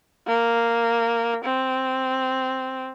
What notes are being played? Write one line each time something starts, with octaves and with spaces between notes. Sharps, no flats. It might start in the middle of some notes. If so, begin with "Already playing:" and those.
A#3
C4